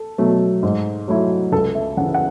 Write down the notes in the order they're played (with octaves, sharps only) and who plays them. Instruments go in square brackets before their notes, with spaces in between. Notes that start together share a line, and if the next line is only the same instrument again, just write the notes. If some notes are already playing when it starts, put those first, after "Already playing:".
Already playing: [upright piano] A4
B2 F#3 A3
G#2
F#3 A3 E4
C#2 A4
E5
C#3 F#5
E3
F#5